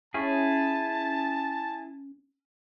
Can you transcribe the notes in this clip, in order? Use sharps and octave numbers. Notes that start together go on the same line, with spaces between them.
C#4 E4 G#4 A5